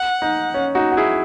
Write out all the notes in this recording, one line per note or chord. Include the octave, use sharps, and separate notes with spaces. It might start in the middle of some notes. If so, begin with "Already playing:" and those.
Already playing: F#5
D#4
C#4
D#4 F#4
F#4
E4 G#4